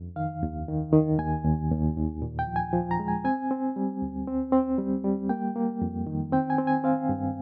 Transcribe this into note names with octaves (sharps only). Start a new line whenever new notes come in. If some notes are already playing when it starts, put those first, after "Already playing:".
Already playing: F2
D#3 F5
D#2
D#3
D#3
D#2 G#5
D#2
D#2
D#2
A#2
G5
F3
G#5
F3
A#5
G#3
G#5
C4 G#5
C4
G3
D2
C4
C4
G3
G3
A#3 G5
A#3
F2
D#3
C4 G5
G#5
C4
G#5
C4 F5
G2